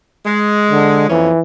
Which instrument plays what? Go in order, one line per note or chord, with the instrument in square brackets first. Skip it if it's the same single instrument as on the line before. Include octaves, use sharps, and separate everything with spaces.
[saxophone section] G#3
[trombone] D3
[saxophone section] F2 A#3 C#4 [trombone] E3